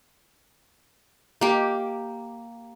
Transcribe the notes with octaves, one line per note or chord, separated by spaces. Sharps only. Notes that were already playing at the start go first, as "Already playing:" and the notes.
A#3 G4